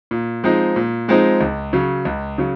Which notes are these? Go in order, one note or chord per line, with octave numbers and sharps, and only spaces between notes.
A#2
F3 G#3 C4 D#4
A#2
F3 G#3 C4 D#4
C#2
C#3 F#3
C#2
C#3 F#3